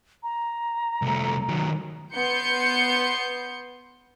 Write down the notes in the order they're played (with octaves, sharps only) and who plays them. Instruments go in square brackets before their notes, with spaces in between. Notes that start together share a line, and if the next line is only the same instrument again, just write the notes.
[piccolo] A#5
[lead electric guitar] C2 A3
D#3 F#3
[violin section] B3 C6 G6 C#7